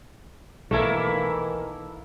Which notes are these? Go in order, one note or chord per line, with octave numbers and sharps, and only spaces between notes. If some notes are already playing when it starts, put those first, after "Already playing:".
B1 D#3 E3 A3 A#3 E4 A4